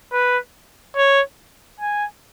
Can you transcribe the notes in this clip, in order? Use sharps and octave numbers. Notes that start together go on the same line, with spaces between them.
B4
C#5
G#5